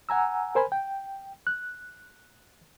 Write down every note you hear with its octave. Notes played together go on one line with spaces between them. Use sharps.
F#5 G#5 A#5 E6
A#4 C5 G#5 B5
G5
F#6